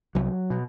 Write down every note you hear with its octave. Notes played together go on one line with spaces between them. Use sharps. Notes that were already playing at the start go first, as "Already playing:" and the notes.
C2 F#3
B2